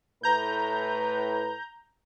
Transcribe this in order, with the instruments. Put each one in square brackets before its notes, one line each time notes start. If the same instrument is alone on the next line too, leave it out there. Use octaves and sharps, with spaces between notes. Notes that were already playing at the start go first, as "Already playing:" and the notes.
[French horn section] A2 B4 [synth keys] A#5 G6